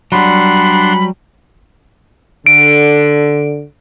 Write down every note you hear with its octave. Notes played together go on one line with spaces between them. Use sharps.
F#3 G3 D4 F#5 B5 C6
D3 D7